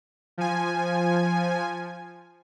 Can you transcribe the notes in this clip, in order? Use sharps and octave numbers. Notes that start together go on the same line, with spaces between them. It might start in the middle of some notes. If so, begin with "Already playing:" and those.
F3 G#5